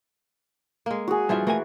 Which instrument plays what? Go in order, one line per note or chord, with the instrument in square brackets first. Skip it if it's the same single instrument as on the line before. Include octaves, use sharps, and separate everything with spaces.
[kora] G#3 A#3
[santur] F#4 G#4
[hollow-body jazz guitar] G2 E5 [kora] E3 F3 F4
[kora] E3 [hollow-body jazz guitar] A3 A#4 G#5